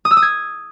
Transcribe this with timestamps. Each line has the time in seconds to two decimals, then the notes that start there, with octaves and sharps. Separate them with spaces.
0.05 D#6
0.11 E6
0.17 D#6
0.22 G#6